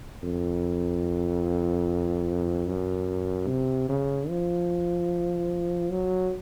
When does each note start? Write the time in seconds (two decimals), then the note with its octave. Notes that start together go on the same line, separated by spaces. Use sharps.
0.24 F2
2.67 F#2
3.47 C3
3.89 C#3
4.29 F3
5.91 F#3